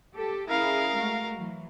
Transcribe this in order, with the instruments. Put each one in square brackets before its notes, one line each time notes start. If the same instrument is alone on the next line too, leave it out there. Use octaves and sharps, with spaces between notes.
[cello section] G4 A4
[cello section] C#4 E4 G#4 [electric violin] A#4 F5
[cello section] G#3 A3 F#4
E3 F#3